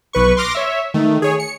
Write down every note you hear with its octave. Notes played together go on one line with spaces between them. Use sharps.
B1 B4 C#6
C6 D6 F6 A#6
C#5 E5
D#3 A3
G#4 C#5
C#7